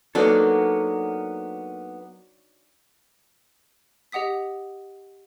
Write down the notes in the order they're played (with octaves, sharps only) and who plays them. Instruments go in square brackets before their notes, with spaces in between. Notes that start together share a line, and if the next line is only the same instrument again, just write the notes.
[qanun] F#3 D4 D#4 [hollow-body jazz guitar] A#3 B3 A4
[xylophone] G4 D#5 F#5 D#6 B6